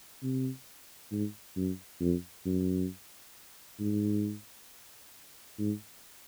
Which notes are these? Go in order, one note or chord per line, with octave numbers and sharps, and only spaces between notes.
C3
G#2
F#2
F2
F#2
G#2
G#2